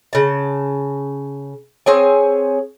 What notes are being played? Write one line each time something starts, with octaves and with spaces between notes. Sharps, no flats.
C#3 A5
C4 G#4 C#5 G#5